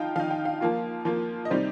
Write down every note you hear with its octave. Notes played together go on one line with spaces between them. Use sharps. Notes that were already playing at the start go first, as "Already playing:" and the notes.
Already playing: F3 D#4 F5 G5
F3 D#4 F5
G5
F5
F3 A#3 F4
F3 A#3 F4
D#5
C3 G3 D#4 C5